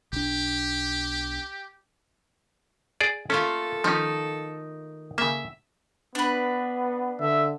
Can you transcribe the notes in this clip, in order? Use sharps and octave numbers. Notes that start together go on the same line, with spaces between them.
B1 D4 G4
G#4 D5
A3 A#3 C#4 F4 A4
D#3 F3 C#4 D#4
C#3 A#3 E5
B3 D4 B4
D3 E5